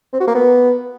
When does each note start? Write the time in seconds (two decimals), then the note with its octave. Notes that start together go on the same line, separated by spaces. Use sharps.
0.13 C4
0.20 F#4
0.28 A#3
0.35 B3